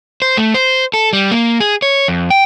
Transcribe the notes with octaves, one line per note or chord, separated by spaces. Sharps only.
C5
A3
C5
A4
G3
A#3
G#4
C#5
F2
G5